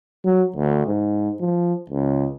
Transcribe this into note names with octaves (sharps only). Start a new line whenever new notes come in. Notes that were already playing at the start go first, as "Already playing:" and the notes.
F#3
D2
G#2
F3
C#2